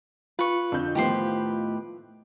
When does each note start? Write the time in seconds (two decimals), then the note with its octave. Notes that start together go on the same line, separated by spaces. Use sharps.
0.39 F4 B4 C#6
0.72 F2 D3 G6
0.95 A2 D#3 F3 B3 G4 B4 C5